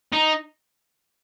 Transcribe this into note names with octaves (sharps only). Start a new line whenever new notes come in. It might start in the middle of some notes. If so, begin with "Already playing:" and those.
D#4